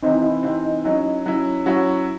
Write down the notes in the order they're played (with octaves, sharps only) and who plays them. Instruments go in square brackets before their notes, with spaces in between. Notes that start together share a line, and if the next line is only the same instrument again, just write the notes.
[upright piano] C3 E3 C4 [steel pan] D#4
[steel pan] E4
[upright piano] C3 E3 C4 [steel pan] D#4
[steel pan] D#4
[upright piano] F#3 C#4 E4 [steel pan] D#4
[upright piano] F#3 C#4 E4
[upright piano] F#3 C#4 E4 [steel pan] F#4